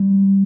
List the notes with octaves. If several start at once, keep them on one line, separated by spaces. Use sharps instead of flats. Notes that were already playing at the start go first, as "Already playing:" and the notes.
Already playing: G3